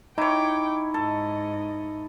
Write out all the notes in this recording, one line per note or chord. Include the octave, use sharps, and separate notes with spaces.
D#4 E4 C#5 G5 D6
G#2 A4 D#5